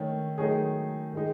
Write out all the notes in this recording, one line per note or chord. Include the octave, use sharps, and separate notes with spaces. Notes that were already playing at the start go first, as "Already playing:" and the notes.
Already playing: D#3 A3 C#4
D#3 F#3 A3 D#4 G#4
D#3 G#3 D#4